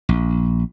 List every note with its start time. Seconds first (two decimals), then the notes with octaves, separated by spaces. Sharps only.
0.09 A#1